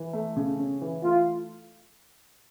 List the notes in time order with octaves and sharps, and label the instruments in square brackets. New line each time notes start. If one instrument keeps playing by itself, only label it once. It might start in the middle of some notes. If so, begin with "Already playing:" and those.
Already playing: [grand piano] E3
A3
C#3
C#4
E3
[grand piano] A3 [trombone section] F4